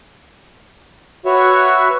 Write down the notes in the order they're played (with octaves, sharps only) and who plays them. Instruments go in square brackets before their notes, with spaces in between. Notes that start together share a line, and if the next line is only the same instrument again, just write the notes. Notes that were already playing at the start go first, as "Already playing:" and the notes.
[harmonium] F#4 B4 C#5 E5